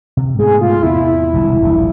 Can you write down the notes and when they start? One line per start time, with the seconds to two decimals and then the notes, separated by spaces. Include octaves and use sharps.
0.17 C3
0.39 G#2 B2 A3 G#4
0.61 F4
0.83 E2 C3 E3 E4
1.34 E1 C2 D3
1.62 D#1 A#1 A#2